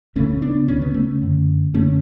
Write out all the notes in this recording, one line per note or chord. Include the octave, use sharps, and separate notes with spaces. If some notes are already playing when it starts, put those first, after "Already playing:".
D2 C#3 A3 C#4
B3 D4
D2 C#3 C#4
B3
A3 C#4
F#2 D3
F#2 D3 A3 C#4